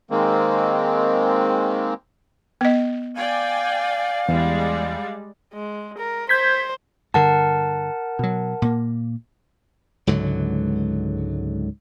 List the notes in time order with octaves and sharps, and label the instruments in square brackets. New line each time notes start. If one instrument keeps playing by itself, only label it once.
[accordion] D#3 G#3 A#3 C4
[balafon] B3 D#5
[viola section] D5 G5 G#5 [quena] F5
[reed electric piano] E2 [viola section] G3 G#3 D5
[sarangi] G#3
A#4
[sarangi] C5 [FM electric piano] G6 G#6 B6
[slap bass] G2 D3 [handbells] A#4 F#5 A5
[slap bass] B2 F#3
A#2 A#3
C#2 G#2 D3 F#3